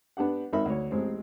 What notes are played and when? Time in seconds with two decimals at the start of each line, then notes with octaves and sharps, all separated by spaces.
0.17 B3 D4 G4 F#5
0.53 G#1 D#4 A#4 E5 B5
0.66 D2 C#5
0.91 A1 G#3 C4